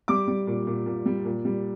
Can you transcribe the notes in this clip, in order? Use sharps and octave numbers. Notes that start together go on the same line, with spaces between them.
G3 D6
G3
A#2
A#2
A#2
G3
A#2
G3